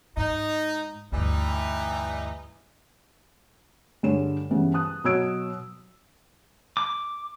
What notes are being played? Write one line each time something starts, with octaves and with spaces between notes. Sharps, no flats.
G#2 D#4
D2 G2 E3 G3 D#4
G2 D3 G#4 C#5 E7
G2 C#3 E3 B3
A5 D#6 F#6
B2 F#3 C#5 E6 G#6 D7
D6